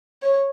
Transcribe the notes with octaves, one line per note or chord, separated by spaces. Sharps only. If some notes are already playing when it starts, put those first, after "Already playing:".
C#5